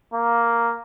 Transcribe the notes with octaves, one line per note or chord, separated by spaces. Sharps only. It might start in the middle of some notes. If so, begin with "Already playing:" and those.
A#3